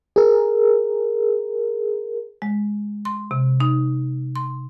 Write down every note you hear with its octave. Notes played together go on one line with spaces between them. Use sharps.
G#4 A#4
G#3
C6
C3
D#4
C6